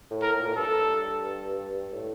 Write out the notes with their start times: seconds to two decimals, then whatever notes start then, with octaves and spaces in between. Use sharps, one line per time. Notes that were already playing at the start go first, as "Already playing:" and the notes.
0.11 A2
0.22 A#4
0.33 A2
0.40 A#2
0.48 A2
0.56 G2 A4
1.93 A2